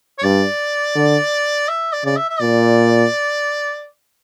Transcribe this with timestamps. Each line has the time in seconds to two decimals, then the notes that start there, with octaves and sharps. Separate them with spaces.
0.19 C#5
0.23 G2 D5
0.96 D3
1.68 E5
1.93 D5
2.05 C#3 D5
2.17 E5
2.29 E5
2.40 A#2 D5